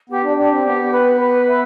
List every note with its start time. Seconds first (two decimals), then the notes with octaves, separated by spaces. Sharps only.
0.09 B3 G4
0.23 D4
0.37 D4 G4
0.51 C4
0.65 B3 G4
0.93 B4
1.20 B4
1.47 E5